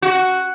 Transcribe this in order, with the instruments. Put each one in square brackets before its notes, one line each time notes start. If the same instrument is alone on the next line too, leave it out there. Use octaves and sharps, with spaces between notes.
[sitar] F#4